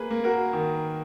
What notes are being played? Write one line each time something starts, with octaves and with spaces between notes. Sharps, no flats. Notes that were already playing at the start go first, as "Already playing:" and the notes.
Already playing: A#3 G#4 B4
A#3
F#4 A#4
D#3